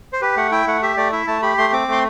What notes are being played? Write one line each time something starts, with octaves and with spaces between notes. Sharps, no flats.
C5
G4 B4
A3 F#5
E4 G5
A3 F#5
G4 E5
A3 D5
E4 E5
A3 A5
G4 B5
A3 C6
C4 D6
A3 C6